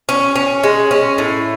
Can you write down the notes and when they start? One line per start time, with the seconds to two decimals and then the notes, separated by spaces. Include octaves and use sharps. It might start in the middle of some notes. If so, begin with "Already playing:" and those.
0.09 C#4
0.36 C#4
0.64 G#3
0.91 C#4
1.18 A2